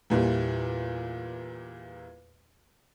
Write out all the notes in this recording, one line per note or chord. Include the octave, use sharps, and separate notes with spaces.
E2 A#2 E3 G3